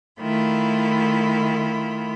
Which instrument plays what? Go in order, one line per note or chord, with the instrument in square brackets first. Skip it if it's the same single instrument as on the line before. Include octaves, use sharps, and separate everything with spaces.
[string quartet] D#3 A3 E4 F4 B5